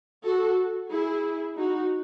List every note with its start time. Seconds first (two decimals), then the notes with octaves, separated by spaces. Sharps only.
0.24 F#4 A4
0.90 E4 G#4
1.57 D#4 F#4